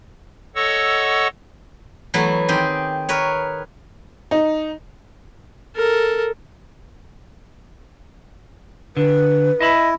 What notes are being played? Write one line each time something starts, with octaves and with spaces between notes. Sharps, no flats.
A4 C#5 D#5 F#5 C#6 E6
E3 F#3 A3 B3 E4
D#3 C4 G4 G#4
A#4 B4 C#5
D#4
A4 A#4
D3 B4
E4 D#5 A5 B5